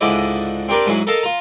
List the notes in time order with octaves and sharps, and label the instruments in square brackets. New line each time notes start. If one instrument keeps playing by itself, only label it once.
[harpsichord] C#2 G#2 D3 E4 D5 D#5
C4 D4 G4 A#4 B4
G#2 F#3 E4 G#4
A4 A#4 D#5 F5 A5
F4 A#5